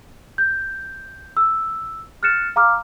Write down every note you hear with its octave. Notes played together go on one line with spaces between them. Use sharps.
G6
E6
F6 F#6 A6 C#7 E7
F5 A#5 D6 F6